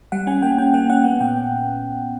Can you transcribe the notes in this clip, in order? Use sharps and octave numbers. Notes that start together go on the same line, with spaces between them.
G3 F#5
C#4 G#5
A#3 G5
C#4 G5
A#3 F#5
C#4 F#5
B3 F#5
A#2 G5